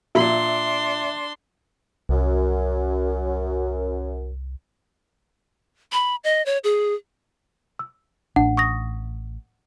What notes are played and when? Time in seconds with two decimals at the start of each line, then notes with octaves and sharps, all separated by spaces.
0.15 A#2 D4 E5 C6
2.09 C2 F#2
5.92 B5
6.24 D#5
6.46 C#5
6.64 G#4
7.79 E6
8.36 A1 D4 F#5
8.57 C#6 D#6 A#6